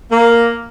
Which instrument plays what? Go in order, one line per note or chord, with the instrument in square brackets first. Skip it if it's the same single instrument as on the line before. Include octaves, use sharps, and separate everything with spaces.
[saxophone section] A#3